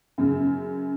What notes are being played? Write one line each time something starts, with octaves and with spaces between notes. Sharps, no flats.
F#2 C#3